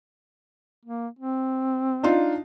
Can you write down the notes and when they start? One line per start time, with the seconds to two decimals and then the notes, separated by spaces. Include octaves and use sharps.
0.85 A#3
1.19 C4
2.03 D4 D#4 F4